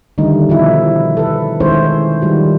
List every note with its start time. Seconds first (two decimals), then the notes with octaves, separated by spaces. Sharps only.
0.18 D3 D#3 G3 A3 D#4
0.49 B2 F3 D#4 E4
1.17 A4 B4
1.60 D#3 G#3 C#4 E4 C5 C#5
2.22 D#3 F3 G3 F#4